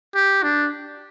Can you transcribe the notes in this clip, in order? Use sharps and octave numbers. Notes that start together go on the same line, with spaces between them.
G4
D4